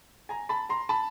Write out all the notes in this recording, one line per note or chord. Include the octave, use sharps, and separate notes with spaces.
G#5 A#5
A5 B5
A#5 C6
A5 B5